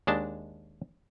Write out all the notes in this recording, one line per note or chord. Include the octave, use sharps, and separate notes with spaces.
D#2 G#3 D4 A5